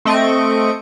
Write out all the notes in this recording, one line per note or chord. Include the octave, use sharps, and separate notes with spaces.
A3 C4 D#5 C#6 D7